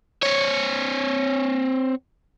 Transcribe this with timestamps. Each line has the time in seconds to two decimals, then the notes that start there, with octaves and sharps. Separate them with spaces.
0.23 C4 C#5